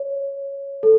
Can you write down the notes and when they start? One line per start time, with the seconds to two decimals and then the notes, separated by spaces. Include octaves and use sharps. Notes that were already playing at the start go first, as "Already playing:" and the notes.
Already playing: C#5
0.83 A4